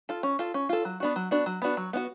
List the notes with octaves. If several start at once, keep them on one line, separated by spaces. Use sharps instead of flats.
F4 A4
C#4
F4 A4
C#4
F4 A4
F#3
B3 D4 F#4
F#3
B3 D4 F#4
F#3
B3 D4 F#4
F#3
B3 D4 F#4